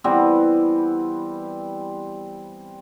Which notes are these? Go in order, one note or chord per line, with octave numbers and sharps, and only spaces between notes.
E3 G3 B3 C4